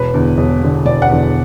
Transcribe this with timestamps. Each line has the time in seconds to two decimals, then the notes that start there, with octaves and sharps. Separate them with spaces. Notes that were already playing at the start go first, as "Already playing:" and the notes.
Already playing: E1 B4
0.14 E2 D3
0.38 E1
0.62 E2 D3
0.86 E1 D5
1.02 F#5
1.09 E2 D3